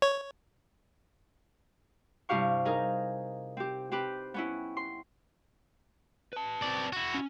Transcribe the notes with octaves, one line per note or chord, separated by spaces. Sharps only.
C#5
G2 C3 E4 G4 F5 C#6
D#4 G#4 A#4
C4 G4
C4 G4 B4
B3 C#4 E4
C6
B4 A5
C4 D5
E4 F#4
C#4